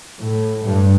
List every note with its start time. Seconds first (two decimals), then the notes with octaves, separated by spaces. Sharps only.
0.19 A2
0.64 G2